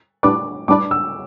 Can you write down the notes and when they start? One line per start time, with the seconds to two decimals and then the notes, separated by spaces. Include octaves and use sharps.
0.23 A2 G3 D4 B4 D5 D6
0.68 A2 G3 D4 B4 D5 D6
0.91 E6